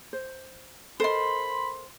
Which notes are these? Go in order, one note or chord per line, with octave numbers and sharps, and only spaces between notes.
C5
A4 A#4 C5 D#5 B5 C6